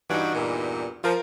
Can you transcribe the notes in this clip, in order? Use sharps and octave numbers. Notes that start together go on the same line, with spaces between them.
G2 E3 D#4 F#4 D5
E2 G2 A#2
F3 F4 A#4